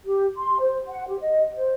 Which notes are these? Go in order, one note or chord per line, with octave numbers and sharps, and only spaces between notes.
G4
C6
C5
F#5
G4
D#5
C5